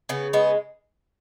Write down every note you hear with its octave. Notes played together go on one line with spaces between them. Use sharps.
C#3 B3
G#3 B3